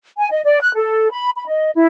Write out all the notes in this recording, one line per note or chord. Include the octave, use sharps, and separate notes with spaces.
G#5
D#5
D5
F#6
A4
B5
B5
D#5
E4